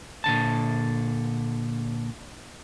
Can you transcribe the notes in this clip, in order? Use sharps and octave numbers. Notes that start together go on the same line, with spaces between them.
A#2 D3 A5